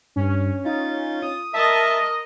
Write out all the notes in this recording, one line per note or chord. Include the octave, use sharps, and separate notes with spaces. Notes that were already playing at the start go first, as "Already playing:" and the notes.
G2 C#4
D#4 F4
D#6
A#4 D#5 E5 A5